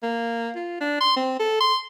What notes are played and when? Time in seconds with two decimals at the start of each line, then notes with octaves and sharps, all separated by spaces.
0.03 A#3
0.56 F4
0.81 D4
1.01 C6
1.17 C4
1.40 A4
1.61 C6